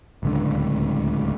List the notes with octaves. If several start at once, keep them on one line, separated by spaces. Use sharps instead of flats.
D1 C#2 D3